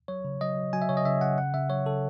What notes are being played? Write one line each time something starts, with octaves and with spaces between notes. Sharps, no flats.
F#3 C#5
C#3
F#3 D#5
F#3
F#3 G#5
E5
C#3 C#5
D#5
C#3 E5
C#3 F#5
C#3 F#5
C#3 E5
F#3 C#5
C#3 A4